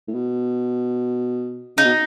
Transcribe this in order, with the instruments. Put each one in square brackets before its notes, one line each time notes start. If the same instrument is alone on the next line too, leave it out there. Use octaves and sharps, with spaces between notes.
[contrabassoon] A2
B2
[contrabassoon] C#3 [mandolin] D#4
[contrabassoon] B2